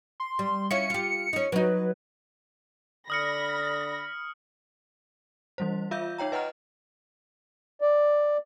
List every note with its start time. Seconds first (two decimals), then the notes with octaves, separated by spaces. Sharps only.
0.20 C6
0.39 G3
0.71 C#4 E4 F4 C#7
0.90 F4 G4
1.33 C#4 D#4
1.52 F#3 D#4 B4
3.10 D3 D5 B5 D#6 F6 A#6 C#7
5.58 E3 G3 C5
5.91 F4 E5 F5 G6
6.18 D#4 C#5 G5 A#5
6.32 B4 D#5 F#5 G5 A#5 F6
7.81 D5